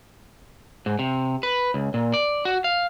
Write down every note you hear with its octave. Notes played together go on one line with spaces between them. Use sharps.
G#2
C3
B4
C#2
A#2
D5
F#4
F5